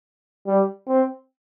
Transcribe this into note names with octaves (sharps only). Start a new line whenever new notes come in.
G3
C4